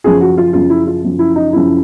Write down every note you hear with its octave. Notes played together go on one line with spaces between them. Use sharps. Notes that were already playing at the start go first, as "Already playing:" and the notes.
F#2 C#3 F3 G#4
F#4
F4
F#2 C#3 F3 F4
E4
F4
F#2 C#3 F3
E4
D#4
F#2 C#3 F3 E4